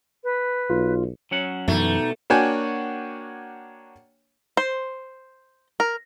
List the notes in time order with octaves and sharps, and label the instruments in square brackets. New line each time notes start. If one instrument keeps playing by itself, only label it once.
[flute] B4
[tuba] B1 [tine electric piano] F4
[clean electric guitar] F#3 C#4 F#5
[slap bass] F#2 E3 [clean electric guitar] B2 G3 [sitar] A3 [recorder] D#4
[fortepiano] A#3 D4 F#4 C#5 G5 G#5
[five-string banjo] C5
A#4